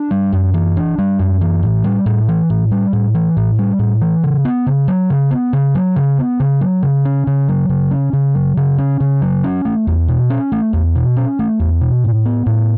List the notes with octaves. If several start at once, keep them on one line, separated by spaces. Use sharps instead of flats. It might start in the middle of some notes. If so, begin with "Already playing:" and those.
Already playing: D4
G3
F#2
E3
D4
G3
F#2
E3
A2
G3
A2
E3
A2
G3
A2
E3
A2
G3
A2
E3
C#3
B3
C#3
F#3
C#3
B3
C#3
F#3
C#3
B3
C#3
F#3
C#3
C#4
C#3
F#3
C#3
C#4
C#3
F#3
C#3
C#4
C#3
F#3
C#4
A3
E2
B2
C#4
A3
E2
B2
C#4
A3
E2
B2
A2
B3
A2